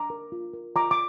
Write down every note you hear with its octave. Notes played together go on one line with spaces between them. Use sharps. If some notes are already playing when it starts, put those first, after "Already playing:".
Already playing: D4 A#5 D6
A#4
F4
A#4
F4 A#5 D6
D6